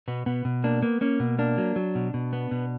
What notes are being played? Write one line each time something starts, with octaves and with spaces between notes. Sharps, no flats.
B2 B3
B2 B3
B2
A#3 D4
A#3 B3
A#3 C#4
B2
A#3 D4
F#3
F#3
B2
B2
B3
B2